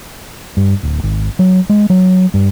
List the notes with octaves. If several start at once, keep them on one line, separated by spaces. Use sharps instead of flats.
G2
D1
G#1
F#3
G#3
F#3
G2